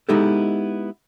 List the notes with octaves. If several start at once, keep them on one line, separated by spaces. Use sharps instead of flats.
G#3 B3 D#4 E4 G4 A4